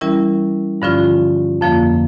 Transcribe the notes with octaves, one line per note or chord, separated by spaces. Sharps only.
E3 G3 C#4 E4 A#4
G2 D3 F3 C#4 F4
F2 D3 F3 A#3